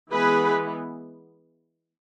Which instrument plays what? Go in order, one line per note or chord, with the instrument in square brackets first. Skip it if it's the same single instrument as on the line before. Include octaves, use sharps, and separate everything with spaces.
[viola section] E3 G#3 B3 G#4 B4